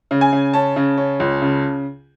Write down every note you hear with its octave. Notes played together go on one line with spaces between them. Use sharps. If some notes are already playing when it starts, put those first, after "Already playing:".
C#3
G#5
C#3
C#4 A5
C#3
C#4
C#2
C#3